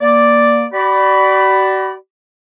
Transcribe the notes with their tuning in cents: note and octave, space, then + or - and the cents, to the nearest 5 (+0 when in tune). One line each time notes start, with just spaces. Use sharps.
A#3 +5 D5 +0
F#4 +45 D5 +0 B5 +0